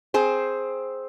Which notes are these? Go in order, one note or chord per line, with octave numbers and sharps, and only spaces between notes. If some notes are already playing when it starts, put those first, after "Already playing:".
C4 G#4 C5